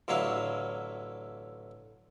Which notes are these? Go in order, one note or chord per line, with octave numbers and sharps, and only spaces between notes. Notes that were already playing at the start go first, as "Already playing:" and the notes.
A1 D3 F#3 E4 F5